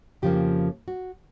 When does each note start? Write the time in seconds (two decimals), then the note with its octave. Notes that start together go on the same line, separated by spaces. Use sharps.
0.22 F2 C#3 F3 A#3 G4
0.88 F#4